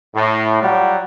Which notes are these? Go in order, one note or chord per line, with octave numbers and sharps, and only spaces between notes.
A2
F#3 G3 F4 F#5